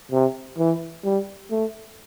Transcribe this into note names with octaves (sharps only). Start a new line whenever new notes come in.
C3
E3
G3
A3